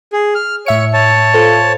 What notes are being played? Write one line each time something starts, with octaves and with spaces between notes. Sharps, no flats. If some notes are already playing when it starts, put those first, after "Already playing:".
G#4
F6
A2 C#5 E5 C#7
C#5 A5
F4 A4 C5